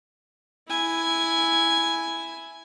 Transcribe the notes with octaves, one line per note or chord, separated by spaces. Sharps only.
E4 G#5